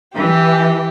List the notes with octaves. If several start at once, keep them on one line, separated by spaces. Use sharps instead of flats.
E3 G4